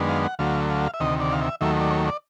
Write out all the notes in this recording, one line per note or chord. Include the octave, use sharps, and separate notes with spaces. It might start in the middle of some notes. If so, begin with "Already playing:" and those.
Already playing: F#2 D#3 G#3 B3 D4
F5
F#5
D2 D3 F#3 A3 F5
F5
E5
D2 C3 D#3 D#5
D5
F5
E5
D#2 D#3 F#3 A3 E5
D5
C#5
D5